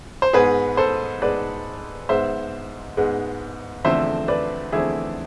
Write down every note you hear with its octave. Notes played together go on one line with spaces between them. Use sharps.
C5
G#2 G#3 B3 G#4 B4
A4 C5
G#2 G#3 B3 B4 D5
G#2 G#3 B3 C5 E5
G#2 G#3 B3
E2 D3 F3 A3 C4 C5 E5
B4 D5
E2 D3 F3 A3 C4 E4 G#4